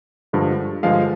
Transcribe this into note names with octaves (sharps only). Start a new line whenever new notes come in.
G2 D3 F3 G#3
G2 D3 F3 G#3 F5